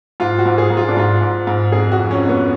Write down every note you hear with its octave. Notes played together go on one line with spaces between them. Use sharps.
G#2 F4
F#4
G#2
G#4
G#2
F4
D4
G#2 F4
G#2
G#2
F2 G#4
F#4
F3
C#4
F2
B3